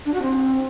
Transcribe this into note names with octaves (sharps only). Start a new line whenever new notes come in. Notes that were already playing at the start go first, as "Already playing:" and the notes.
D4
F#4
C4